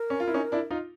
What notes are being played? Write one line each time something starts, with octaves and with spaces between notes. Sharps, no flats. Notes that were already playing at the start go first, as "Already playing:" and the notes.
Already playing: A#4
C#4
F4
E4
C#4 D#4
D4 E4
D#4 F4